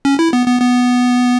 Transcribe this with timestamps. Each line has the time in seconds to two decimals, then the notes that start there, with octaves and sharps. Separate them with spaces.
0.05 C#4
0.19 E4
0.33 B3
0.47 B3
0.62 B3